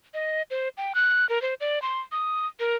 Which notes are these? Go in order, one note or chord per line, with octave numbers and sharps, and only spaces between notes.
D#5
C5
G5
F#6
A#4
C5
D5
C6
D#6
A#4